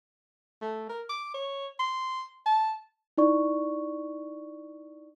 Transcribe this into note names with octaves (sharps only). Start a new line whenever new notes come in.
A3
A#4
D6
C#5
C6
A5
D#4 E4 D5 C#6